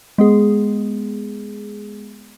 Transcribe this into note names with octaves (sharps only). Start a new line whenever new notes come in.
G#3 B3 G#4